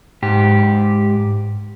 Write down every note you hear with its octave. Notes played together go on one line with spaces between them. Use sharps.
G#2 G4